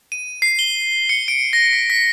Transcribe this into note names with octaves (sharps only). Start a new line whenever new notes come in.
D#7
C7
G7
C#7
D7
A#6
B6
B6